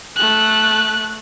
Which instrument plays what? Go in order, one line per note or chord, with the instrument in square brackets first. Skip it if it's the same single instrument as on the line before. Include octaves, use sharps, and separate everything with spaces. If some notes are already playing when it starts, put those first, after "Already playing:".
[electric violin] A3 F#6